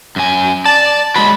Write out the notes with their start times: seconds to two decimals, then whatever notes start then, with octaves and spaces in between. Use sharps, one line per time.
0.16 F#2 G#5
0.66 D5 A5
1.16 F#3 G#3 B5